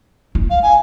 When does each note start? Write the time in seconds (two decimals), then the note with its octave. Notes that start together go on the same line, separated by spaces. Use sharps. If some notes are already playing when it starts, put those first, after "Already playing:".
0.35 E4
0.50 F5
0.63 G#5